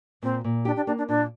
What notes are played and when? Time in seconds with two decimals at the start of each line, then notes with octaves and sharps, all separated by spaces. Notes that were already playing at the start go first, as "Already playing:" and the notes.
0.22 A#2 C4
0.44 A#2
0.65 D4 G4
0.76 D4
0.87 A#3 D4
0.98 D4
1.08 A#2 D4